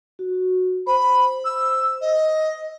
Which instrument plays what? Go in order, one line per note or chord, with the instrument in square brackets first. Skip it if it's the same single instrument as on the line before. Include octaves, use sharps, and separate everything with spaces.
[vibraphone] F#4
[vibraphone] C5 [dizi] B5
[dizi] E6
D#5